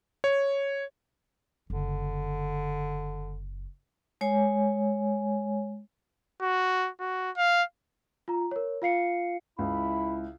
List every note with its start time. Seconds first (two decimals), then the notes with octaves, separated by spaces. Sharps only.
0.24 C#5
1.70 F#1 D3
4.21 G#3 C#5 G#5
6.42 F#4
7.00 F#4
7.37 F5
8.28 F4 A#5
8.51 A#4 C#5
8.82 F4 F5 C7 C#7
9.59 C#2 E4 B5